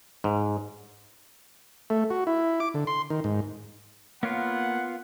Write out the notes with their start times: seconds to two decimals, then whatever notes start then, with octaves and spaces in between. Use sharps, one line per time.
0.24 G#2
1.90 A3
2.10 F#4
2.27 E4
2.60 D6
2.74 D3
2.87 C6
3.10 D#3
3.24 G#2
4.23 A#3 B3 F4 A#4 C#5 F#5